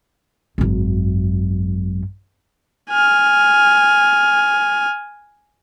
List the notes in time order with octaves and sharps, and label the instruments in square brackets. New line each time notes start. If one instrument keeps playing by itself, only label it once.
[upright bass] G#1 F#2
[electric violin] G#5 F6